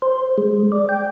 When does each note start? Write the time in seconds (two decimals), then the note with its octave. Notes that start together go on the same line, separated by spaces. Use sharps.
0.02 C5
0.38 G#3
0.72 D5
0.89 G5